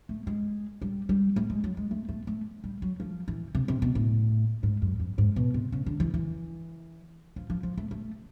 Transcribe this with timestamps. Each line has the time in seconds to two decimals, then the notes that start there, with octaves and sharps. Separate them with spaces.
0.09 A3
0.27 G#3
0.82 G3
1.09 G3
1.36 A3
1.50 G#3
1.64 F#3
1.77 G#3
1.91 A3
2.09 A3
2.27 A3
2.64 G3
2.82 F#3
3.00 F3
3.28 E3
3.55 C3
3.68 C3
3.82 B2
3.95 A2
4.63 G#2
4.82 F#2
5.00 F2
5.18 G#2
5.36 B2
5.54 C3
5.72 C#3
5.86 D3
6.00 E3
6.14 E3
7.36 F3
7.50 F3
7.63 F3
7.78 A3
7.91 A3